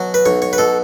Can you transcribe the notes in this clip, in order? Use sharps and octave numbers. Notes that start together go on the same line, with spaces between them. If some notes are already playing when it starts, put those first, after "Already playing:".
Already playing: B2 F#3
B4
B1 C#5
C#5
B4
B2 A4